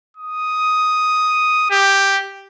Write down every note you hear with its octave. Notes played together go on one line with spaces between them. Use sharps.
D#6
G4